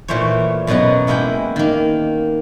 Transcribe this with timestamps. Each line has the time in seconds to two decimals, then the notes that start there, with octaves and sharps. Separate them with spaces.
0.08 A#2 E3 A3 C5 C#5
0.67 F#2 B2 F#3 B3 F#5
1.07 G#3 A#3 E4 F#5 G5
1.56 D#3 A#3